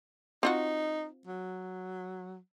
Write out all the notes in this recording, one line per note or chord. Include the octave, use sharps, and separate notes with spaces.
C4 D#4 F4 F#4
F#3